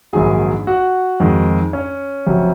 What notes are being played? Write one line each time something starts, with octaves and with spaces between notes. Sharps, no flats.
A#1 G#2 D#3 F#3 G#4 G#5
F#4 F#5
F2 D#3 G#3
C#4 C#5
F1 F2 C3 F#3